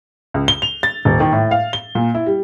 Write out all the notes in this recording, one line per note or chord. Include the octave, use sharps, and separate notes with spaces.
C#2
G7
F7
A6
D#1
D#3
A2
F5
G7
A#2
E4
G3